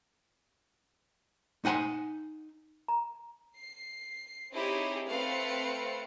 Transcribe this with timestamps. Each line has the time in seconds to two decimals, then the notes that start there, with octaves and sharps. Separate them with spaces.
1.65 D#4 F#5 G#5 B5 C6
2.88 A#5
3.57 C7
4.52 C4 D#4 E4 G4 G#4 C#5
5.08 A3 C4 B4 F5 C#7